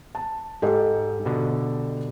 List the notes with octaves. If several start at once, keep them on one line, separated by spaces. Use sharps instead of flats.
A5
G#2 G4 A4 D#5
B2 D3